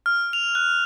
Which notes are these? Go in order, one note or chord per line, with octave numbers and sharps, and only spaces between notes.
F6
F7
F#6